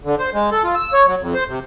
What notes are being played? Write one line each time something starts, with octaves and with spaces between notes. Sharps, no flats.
D3
C5
G#3
A4
F4
E6
C#5
F#3
F2
C5
C3